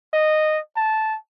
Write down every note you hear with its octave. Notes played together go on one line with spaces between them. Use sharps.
D#5
A5